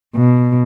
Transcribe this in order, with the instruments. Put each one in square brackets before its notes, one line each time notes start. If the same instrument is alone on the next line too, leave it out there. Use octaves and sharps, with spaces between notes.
[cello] B2